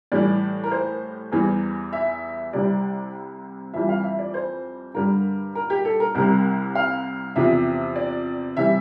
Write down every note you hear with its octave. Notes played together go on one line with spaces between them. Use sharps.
A2 E3 G3 D5
A#4
C5
E2 E3 G3
E5
C2 C3 G3 D5
F2 E3 G3 E5
F5
E5
D5
C5
G2 D3 G3 A#4
A#4
G4
A4
A#4
C2 C3 G3 A#4
F5
E2 C3 F3 E5
D5
C3 E3 G3 E5